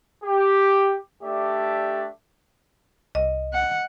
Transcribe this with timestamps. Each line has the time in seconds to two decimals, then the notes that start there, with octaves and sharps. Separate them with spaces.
0.23 G4
1.23 A3 D4 G4 D5 E5
3.15 C2 D#5
3.54 F#5